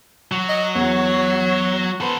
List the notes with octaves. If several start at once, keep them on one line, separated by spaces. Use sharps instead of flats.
F#3 F#4
D#5
E2 C#5
B3 A4 B4 C5